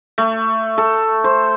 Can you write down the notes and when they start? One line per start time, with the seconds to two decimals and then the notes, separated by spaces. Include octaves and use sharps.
0.18 A3
0.78 A4
1.24 C5